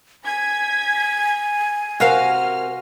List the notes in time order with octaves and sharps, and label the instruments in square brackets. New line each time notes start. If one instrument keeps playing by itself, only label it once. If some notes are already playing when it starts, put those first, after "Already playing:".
[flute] G#5 [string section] G#6 B6
[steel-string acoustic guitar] C3 A#4 C5 [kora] F#4 E5 F5 [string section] F6